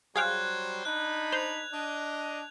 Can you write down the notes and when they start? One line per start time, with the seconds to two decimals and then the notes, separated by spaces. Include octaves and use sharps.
0.16 F#3 G3 G#4 C5 F5 G5 F#6 G#6
0.85 D4 D#4 B5 F#6
1.32 C5 F7
1.72 D4 D#5